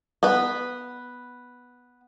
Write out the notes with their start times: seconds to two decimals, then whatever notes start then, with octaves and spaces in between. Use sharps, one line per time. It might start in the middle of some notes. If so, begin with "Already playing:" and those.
0.23 B3 B4